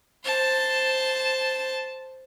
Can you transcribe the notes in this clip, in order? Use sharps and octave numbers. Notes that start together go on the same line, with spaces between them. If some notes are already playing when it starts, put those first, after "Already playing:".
C5 A5